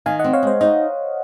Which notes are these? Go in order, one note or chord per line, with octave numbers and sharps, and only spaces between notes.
D#3 F5 G#5
D#5 F#5
C4
C#5 F5
G#3 C5 D#5
D#4 C5 D#5